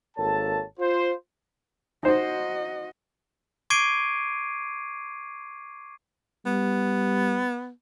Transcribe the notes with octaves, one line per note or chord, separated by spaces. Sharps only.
G#1 A#3 A4 C#5 A5
F4 C5
D#4 F#4 C5 D#5
C#6 D6 G#6 C7 D7 D#7
G3 B3